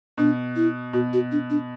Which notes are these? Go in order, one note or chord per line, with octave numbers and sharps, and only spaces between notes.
B2 D4
E4
B2 F#4
F#4
D4
D4